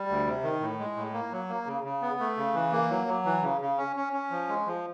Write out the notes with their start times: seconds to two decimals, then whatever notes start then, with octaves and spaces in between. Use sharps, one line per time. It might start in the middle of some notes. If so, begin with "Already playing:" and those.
Already playing: G3
0.08 D2
0.26 C3
0.43 D#3
0.60 A2
0.79 G#3
0.96 A2
1.13 A#3
1.32 F#3
1.49 A#3
1.66 C#3
1.84 C#3
2.02 B3
2.20 A3
2.37 C#3
2.54 E3
2.72 A#3
2.90 F#3
3.07 F#3
3.25 E3
3.42 C#3
3.61 C#3
3.78 C#4
3.96 C#4
4.13 C#4
4.31 F3
4.49 G#3
4.66 F3